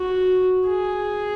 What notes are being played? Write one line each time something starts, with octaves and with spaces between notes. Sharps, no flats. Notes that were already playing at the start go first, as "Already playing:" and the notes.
Already playing: F#4
G#4